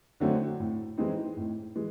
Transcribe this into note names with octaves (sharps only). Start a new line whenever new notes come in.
D3 F#3 A3 C4
A2
E3 G#3 C4 D#4
A2
E3 G#3